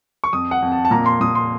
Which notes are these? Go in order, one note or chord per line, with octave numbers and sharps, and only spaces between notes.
C#6
F2 D#6
F#5
F2
A5
A5
A#2 A#5
C6
A#2 D#6
C6